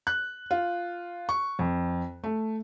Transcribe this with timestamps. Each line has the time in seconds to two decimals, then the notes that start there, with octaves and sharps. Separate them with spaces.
0.07 F#6
0.51 F4
1.29 C#6
1.59 F2
2.24 A3